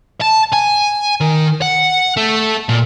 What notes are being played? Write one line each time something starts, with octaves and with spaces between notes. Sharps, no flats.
A5
G#5
D#3
F#5
A3
A#2